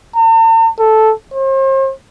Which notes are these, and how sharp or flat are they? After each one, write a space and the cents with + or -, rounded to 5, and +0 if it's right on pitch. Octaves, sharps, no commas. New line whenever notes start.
A5 +45
A4 -5
C5 +40